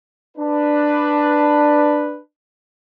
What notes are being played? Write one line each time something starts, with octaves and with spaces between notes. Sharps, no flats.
D4 B4